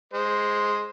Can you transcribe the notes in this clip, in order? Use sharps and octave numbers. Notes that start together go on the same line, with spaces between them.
G#3 C5